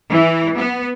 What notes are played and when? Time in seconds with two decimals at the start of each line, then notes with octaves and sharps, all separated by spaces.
0.11 E3
0.57 B3